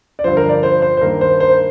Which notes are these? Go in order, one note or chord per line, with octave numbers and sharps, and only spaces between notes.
D5
G2 D3 F3 C5
A#4
D5
C5
C5
C5
G2 D#3 A#3 A#4
C5
C5